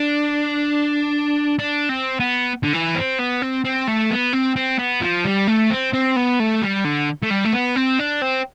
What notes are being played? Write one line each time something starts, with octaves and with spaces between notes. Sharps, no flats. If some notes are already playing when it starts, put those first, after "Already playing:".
Already playing: D4
D4
C4
B3
D3
E3
C4
B3
C4
C4
A3
B3
C4
C4
B3
F3
G3
A3
C4
C4
B3
A3
G3
D3
A3
G3
A3
B3
C4
D4
C4